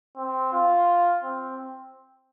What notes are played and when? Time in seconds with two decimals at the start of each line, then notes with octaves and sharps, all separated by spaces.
0.17 C4
0.53 F4
1.24 C4